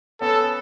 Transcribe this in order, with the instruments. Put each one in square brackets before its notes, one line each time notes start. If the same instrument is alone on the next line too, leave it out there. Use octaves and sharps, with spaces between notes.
[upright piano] B3 C#4 [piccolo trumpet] A4